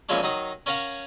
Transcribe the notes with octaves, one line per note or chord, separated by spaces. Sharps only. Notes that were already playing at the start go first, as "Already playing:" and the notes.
A#2 E3 F3 G#3 C#4 D4
D#3 F#3 D#4 D#6
C#4 A#4 C#5 F5 F#5 A#5